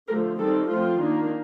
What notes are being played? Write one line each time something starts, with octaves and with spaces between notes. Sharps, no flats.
D3 F3 A3 A#4
D#3 G3 C4 A4
F3 A3 C4 F4
D#3 A#3 D4